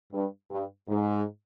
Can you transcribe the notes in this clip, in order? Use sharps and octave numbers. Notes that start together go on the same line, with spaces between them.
G2
G2
G#2